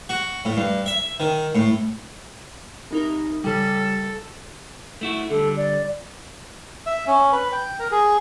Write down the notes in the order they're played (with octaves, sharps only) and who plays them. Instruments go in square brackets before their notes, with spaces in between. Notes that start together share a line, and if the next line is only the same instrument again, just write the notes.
[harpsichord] F#4
A2
G2
E5
D#3
A2
[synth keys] C2 D#4 A#4
[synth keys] C#3 G3 [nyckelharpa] A4
[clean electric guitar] A3 E4 F#4
[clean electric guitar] D3 G3 [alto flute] A4
[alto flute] D5
[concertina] E5
C#4
B4
G5
A#4
G#4